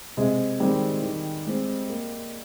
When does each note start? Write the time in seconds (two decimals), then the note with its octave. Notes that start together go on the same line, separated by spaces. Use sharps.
0.17 C3 G#3
0.60 D#3 G3 G#3 C4
1.02 D#3
1.47 G#3 C4
1.90 A#3